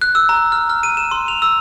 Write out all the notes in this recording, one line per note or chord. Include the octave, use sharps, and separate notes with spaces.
F#6
E6
A#5
F6
F6
D#7
E7
C6
F7
E6